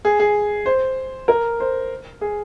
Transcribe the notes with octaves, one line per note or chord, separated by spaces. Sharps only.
G#4
G#4
C5
A#4
C5
G#4